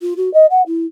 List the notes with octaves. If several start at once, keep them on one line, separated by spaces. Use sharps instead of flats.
F4
F#4
D#5
F#5
E4